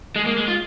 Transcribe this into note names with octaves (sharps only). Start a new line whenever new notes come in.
G#3
A#3
G#3
F4